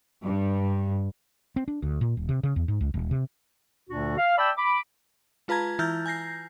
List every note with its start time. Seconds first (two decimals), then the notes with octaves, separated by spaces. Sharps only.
0.23 G2
1.56 C4
1.68 D4
1.82 D2
2.01 A#2
2.17 D#1
2.29 C3
2.43 C#3
2.56 E2
2.68 G#2
2.81 C#2
2.94 D#1
3.11 C3
3.90 D2 A#2 D3 D4 F#4
4.17 F5
4.37 D5 E5 G5 A5 B5 E6
4.57 B5 D6
5.48 G#3 F4 B4 A5 A#5 G#6
5.79 E3 E4 A#5 F6 G6 A6
6.06 G#5 G6 A#6 C7